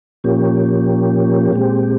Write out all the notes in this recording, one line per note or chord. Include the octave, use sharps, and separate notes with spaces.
A#2 F3 A#3 C#4 G4
A#2 G#3 C4 G4